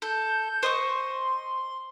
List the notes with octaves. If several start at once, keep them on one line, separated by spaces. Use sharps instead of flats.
A4 G6
C5 D#5 C6 C#6